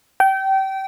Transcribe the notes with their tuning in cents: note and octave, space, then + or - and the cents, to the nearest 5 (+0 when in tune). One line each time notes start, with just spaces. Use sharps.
G5 -25